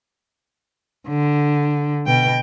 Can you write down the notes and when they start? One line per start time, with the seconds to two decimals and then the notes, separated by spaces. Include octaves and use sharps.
1.08 D3
2.07 B2 G5